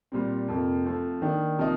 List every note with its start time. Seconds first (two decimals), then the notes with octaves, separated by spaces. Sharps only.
0.12 A#2 G3 C4
0.48 F2 C3 F3 A#3
0.85 F3 A3 C4
1.22 D#3 A#3 D4
1.58 C3 F3 A#3 D#4